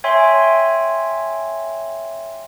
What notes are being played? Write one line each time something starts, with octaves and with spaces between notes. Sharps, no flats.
C#5 E5 G5 G#5 C6